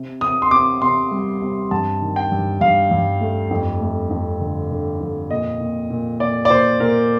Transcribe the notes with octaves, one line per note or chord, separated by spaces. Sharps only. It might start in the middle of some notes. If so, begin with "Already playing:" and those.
Already playing: C3
C3 D#6
C6
C3 D6
C3 C6
G3
C3
G2 A5
D#3
G5
G2
G2 F5
G2
A3
F2
A3
F2
D3
D3
F2
A#2 D#5
A#2
A#2
A#2 D5
D5
A#2 C5
A#2 A#4